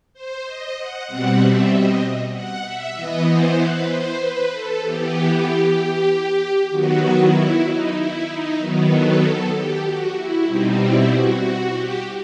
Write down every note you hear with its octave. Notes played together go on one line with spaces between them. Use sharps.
C5
D#5
F#5
B2 G3 C4 F#5
E5
D#5
F#5
E5
E3 B3 D#5
C5
B4
C5
B4
A4
E3 B3 G4
D#3 F#3 B3 F#4
E4
D#4
E4
D#4
D#3 F#3 B3
A4
A4
G4
F#4
E4
B2 G3 C4 D#4
E4
F#4
F#4
G4